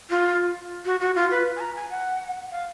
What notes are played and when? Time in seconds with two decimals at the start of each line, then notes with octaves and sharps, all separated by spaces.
0.10 F4
0.85 F#4
1.00 F#4
1.16 F4
1.31 B4
1.56 G#5
1.60 A#5
1.76 G#5
1.90 F#5
2.51 F5